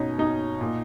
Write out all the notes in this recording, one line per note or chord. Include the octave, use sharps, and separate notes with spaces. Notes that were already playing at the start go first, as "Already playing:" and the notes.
Already playing: B2 C#4 D#4
B2 D#4
A#2